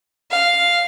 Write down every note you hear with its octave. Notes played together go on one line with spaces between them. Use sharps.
F5